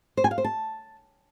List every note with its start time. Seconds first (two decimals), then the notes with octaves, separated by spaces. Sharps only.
0.17 C5
0.24 G#5
0.31 F5
0.38 C5
0.44 A5